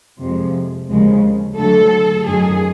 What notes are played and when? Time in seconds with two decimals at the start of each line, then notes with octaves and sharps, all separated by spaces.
0.20 F2 C3 F3 G#3
0.89 D#2 C#3 F3 G#3
1.58 D2 D3 F#3 A3 A4
2.26 F#2 D#3 F#3 G#4